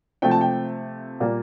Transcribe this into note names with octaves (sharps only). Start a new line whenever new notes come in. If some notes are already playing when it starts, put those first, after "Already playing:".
C3 F3 A3 G5
A5
G5
A#2 G3 A#3